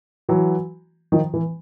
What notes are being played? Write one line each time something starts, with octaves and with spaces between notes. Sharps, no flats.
E3 F#3
D#3 F3
E3